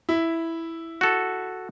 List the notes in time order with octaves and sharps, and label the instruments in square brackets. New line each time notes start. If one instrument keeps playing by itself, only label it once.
[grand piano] E4
[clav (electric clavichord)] F#4 A4